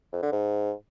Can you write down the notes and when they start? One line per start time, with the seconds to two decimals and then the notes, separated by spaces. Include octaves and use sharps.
0.13 F2
0.22 D3
0.32 G#2